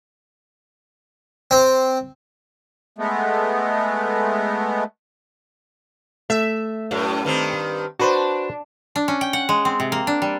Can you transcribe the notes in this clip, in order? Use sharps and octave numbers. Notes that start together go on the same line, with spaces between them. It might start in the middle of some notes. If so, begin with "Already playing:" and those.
C4
G#3 A3 B3
A3 E5
F#2 A2
G2 D#3 C4
D4 F#4 B4 C5
D4
C#4
G5
F#5
G#3
C4
C3
A#3
D4
G3